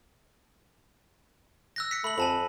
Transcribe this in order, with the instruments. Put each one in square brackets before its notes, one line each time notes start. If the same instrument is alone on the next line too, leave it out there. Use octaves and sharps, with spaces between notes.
[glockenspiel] E6 F#6 A#6
B6 C#7
[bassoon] A3 [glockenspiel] B5 F#7
[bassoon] F2 [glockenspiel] G#5 A5 B5